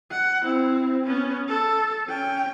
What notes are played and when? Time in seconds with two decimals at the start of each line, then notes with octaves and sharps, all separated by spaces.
0.11 F#5
0.42 C4 E4
1.04 B3 C#4
1.48 A4
2.08 C#4 G5